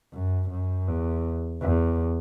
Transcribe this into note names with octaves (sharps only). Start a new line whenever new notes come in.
F#2
F#2
E2
E2